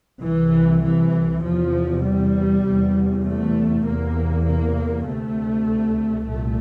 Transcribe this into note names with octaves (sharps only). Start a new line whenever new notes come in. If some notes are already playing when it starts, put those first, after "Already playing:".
C2 C3 E3
E3
E2 C3 F3
G3
E2 C3
A3
E2 C3 A#3
A#3
D2 C3 A3
C2 A#2 A3